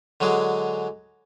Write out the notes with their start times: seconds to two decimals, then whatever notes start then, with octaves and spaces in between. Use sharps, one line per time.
0.20 D3 F#3 G#3 G#4